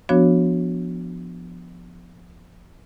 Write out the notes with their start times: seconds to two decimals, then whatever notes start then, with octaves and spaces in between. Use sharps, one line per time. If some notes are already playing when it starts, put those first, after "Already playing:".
0.09 F3 B3 D4 F#4 C#5